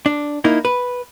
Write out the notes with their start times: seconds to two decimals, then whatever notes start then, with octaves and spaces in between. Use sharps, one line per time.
0.06 D4
0.44 A#3 D#4 E4
0.65 B4